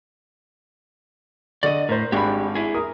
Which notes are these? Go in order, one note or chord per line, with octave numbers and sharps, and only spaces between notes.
D3 D5 D#5 C#6
A2 A#4 C5
G#1 D4 G4 B5
E4 G#4
A#4 D#6